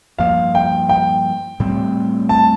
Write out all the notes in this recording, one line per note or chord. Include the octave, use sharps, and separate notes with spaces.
G2 F3 A#3 F5
G5
G5
A2 G3 C4
A5